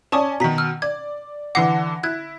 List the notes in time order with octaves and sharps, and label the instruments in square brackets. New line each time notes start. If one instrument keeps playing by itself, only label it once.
[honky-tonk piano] C#4 D5 G#5 [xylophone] A5 C#6 D#6
[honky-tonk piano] B2 D#3 [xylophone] A#5 B6
[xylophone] E6 F6
[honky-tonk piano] D5 [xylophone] G#6
[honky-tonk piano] D3 E3 A#6 [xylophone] F#5 D6 C7
[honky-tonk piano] E4 [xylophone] F#6 G#6